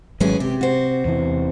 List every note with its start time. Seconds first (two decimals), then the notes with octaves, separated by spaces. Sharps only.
0.20 G#1 E3 F#3 G#3 C#4 G#4
0.40 C3 G4
0.61 F#4 C5
1.05 E2 C3 E3